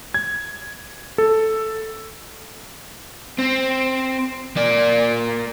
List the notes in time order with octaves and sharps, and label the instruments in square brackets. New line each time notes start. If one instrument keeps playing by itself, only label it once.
[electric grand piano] G#6
A4
[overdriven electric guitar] C4
A#3 D5